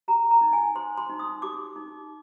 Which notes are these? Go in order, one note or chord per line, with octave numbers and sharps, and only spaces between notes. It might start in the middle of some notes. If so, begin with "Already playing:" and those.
G4 A#5
A#5
D#4
G#5
C5 C6
C6
D#4
D#6
G4 D6
D#4